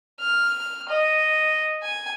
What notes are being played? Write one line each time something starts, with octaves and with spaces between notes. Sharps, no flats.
F6
D#5
G#5